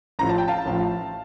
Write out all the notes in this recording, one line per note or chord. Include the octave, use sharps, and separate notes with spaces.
A1 A2 F3 A#5
A5
G5
F5 A5
A1 A2 F3